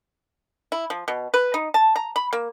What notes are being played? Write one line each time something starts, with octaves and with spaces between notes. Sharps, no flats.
E4
F3
B2
B4
D#4
A5
A#5
B5
A#3